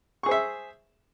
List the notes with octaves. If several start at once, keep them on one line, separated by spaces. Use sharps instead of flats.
G#4 C5 E5 C#6